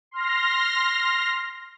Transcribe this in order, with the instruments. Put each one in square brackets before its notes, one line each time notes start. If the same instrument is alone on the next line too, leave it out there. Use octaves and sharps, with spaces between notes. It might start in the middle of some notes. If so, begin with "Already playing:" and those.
[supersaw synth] C6 F6 A#6